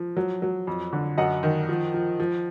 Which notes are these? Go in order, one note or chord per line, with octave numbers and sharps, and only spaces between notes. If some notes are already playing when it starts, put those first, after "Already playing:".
Already playing: F3
F#3
F#3
F2
D3
F#2 D#5 F#5
D#3
F3
F3
F3